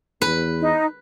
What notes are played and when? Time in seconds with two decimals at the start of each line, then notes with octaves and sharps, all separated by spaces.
0.22 E2 B4
0.60 D#4